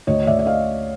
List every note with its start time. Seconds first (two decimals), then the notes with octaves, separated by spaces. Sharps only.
0.07 D2 C#5 D#5
0.27 D2 D5 E5
0.39 E5
0.46 D#5 F5